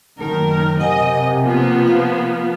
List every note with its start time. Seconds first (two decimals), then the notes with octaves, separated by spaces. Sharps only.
0.21 F#1 F#2 D#3 A3 A#4
0.80 C3 A#4 D#5 F#5 G#5
1.44 F3 A#3 B3
1.87 B4 F5